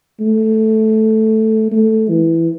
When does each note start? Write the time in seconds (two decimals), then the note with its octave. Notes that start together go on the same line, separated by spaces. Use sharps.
0.20 A3
1.72 A3
2.09 E3